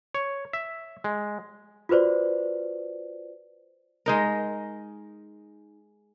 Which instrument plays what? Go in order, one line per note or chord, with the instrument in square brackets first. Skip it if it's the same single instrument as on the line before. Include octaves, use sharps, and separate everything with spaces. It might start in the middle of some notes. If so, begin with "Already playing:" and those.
[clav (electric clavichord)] C#5
E5
G#3
[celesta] F4 F#4 B4 C5 D5
[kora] G#3 D#4 A#4